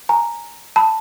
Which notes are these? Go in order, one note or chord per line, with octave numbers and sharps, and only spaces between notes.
G#5 A#5
A5 B5